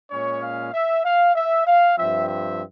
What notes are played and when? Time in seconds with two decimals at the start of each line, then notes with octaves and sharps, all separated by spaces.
0.11 A#2 G#3 C#4 C#5
0.42 F5
0.73 E5
1.05 F5
1.36 E5
1.67 F5
1.97 G2 F3 C4 E5
2.29 E5